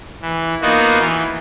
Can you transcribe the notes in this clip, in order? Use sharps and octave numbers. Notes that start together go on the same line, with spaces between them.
E3
A#3 B3 D#4 F4 F#4
E3